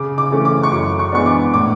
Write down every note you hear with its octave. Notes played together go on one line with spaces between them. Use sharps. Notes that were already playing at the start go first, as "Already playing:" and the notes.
Already playing: C#3 D6
D6
E3 A3 C#4
D6
C#6
F#2 D6
C#6
E3 G#3 B3 D4 C#6
D6
A2 D6